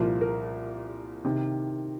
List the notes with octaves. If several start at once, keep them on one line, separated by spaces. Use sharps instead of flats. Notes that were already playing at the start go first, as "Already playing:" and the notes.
Already playing: C2 A#2 F3 A#4
A#4
C3 D#3